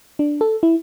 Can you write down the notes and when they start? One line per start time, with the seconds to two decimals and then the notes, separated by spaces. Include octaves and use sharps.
0.19 D4
0.41 A4
0.63 E4